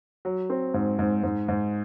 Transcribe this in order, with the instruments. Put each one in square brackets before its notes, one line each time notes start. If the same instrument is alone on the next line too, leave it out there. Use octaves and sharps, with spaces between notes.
[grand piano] F#3
C4
G#2
G#2
G#2
G#2